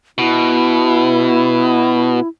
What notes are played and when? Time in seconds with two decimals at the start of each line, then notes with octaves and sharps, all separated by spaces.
0.18 B2 E4